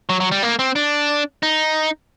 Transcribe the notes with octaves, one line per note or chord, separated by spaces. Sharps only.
F#3
F#3
G3
A#3
C4
D4
D#4